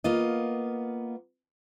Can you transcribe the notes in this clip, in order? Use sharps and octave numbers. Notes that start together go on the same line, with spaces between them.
A#3 B3 F4 D#5